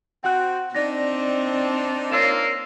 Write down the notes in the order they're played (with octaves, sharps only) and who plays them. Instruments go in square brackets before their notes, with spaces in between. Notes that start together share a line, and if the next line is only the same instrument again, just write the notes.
[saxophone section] C4 F#4 [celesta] F#5 F#6
[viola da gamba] C4 [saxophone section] D4 D#4 [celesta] D5 A#6
[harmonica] A#3 F4 [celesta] C#5 E6 E7